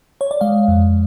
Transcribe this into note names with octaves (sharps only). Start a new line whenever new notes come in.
C#5
D5
G#3 F5
F2